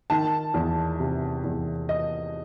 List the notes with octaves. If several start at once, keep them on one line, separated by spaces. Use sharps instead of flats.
D#3 A5
E2
C3
E2
D#5